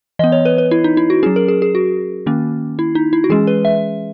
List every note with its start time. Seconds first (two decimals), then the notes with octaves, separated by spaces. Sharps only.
0.19 E3 B3 D#5
0.32 C#5
0.45 B4
0.58 B4
0.71 E4
0.84 D#4
0.97 E4
1.10 F#4
1.23 F#3 C#4 G#4
1.36 A#4
1.48 G#4
1.62 G#4
1.75 F#4
2.26 D#3 A#3 C#4
2.79 E4
2.95 D#4
3.13 E4
3.24 F#4
3.30 E3 G#3 C#4 G#4
3.47 B4
3.65 E5